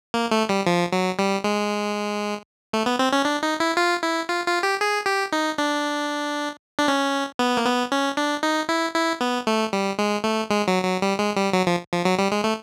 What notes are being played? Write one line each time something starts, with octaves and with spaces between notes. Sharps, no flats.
A#3
A3
G3
F3
F#3
G3
G#3
A3
B3
C4
C#4
D4
D#4
E4
F4
E4
F4
F4
G4
G#4
G4
D#4
D4
D4
C#4
B3
A#3
B3
C#4
D4
D#4
E4
E4
B3
A3
G3
G#3
A3
G#3
F#3
F#3
G3
G#3
G3
F#3
F3
F3
F#3
G3
G#3
A3